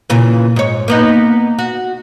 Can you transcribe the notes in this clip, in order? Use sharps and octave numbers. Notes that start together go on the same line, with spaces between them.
A#2 C#3 E3
G#2 C#5
A#3 B3 D#4
F#4